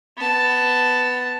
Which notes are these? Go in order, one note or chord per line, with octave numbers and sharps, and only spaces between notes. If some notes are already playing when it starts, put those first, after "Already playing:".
B3 A5